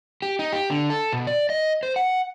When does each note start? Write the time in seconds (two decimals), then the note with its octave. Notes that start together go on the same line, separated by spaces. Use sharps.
0.22 G4
0.39 D#4
0.53 G4
0.70 D3
0.90 A4
1.12 B2
1.27 D5
1.50 D#5
1.83 C5
1.96 F#5